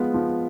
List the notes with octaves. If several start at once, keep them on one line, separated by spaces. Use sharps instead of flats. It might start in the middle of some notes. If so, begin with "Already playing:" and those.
Already playing: F3 G#3 B3 F4
F3